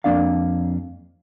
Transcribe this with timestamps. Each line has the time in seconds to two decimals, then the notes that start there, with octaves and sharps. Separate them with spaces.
0.04 F2 F#3 A#3 D4 D5 F5